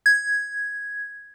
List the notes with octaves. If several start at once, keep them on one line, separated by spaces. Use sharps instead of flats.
G#6